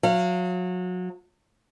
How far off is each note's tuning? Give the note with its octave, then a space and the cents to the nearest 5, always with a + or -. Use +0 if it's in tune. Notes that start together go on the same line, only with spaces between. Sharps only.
F#3 -30 F5 -25